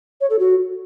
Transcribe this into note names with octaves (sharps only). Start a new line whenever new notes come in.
C#5
A4
F#4